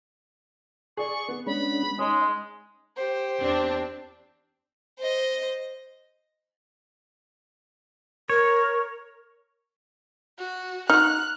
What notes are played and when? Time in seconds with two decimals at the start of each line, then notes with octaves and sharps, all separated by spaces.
0.97 G#4 D5 C#6
1.28 B3
1.47 G#3 C#4 D4 B5
1.99 G#3 C#4 D#4 D#5
2.97 G4 C5
3.40 E2 C4 D4
4.98 C5 D#5
8.30 A#4 C#5
10.39 F#4
10.90 D#4 F#4 F6 F#6